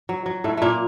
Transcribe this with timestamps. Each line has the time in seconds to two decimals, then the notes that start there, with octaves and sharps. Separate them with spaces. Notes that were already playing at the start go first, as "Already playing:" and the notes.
0.09 F#3
0.26 F#3
0.44 A2 A3
0.57 A#2 A3 A#3